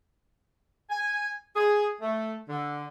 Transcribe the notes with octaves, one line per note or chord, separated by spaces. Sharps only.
G#5
G#4
A3
D3